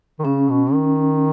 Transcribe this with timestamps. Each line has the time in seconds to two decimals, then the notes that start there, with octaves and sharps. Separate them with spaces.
0.20 D#3
0.25 C#3 C#4
0.50 B2
0.74 D#3